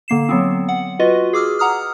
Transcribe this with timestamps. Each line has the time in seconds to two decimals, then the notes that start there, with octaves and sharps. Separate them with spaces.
0.08 D3 A#3 C7 E7
0.29 F#3 B3 C4
0.69 F#5
0.99 F4 F#4 B4 D#5
1.33 G#4 D6 E6 F6
1.59 F#5 A#5 D#6 F6